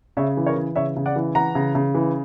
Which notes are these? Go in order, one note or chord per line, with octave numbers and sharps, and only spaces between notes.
C#3 C#5 E5
E3
A#4 C#5
E3
C#3 C#5 E5
C#3
D5 F#5
E3
E3 F#5 A#5
C#3
C#3
E3